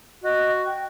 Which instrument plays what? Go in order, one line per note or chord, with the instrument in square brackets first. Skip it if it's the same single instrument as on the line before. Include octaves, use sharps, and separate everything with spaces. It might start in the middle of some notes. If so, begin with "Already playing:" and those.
[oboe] F#4 [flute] D#5
[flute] G5